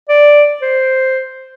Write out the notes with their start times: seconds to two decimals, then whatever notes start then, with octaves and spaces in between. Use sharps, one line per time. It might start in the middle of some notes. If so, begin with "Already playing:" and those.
0.09 D5
0.62 C5